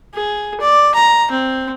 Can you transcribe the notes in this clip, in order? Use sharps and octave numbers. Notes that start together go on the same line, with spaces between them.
G#4
D5
A#5
C4